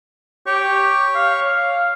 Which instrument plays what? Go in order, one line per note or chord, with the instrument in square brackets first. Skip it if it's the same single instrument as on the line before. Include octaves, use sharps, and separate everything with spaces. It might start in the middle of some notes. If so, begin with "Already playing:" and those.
[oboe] G4 [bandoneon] C#5 C#6
[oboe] F5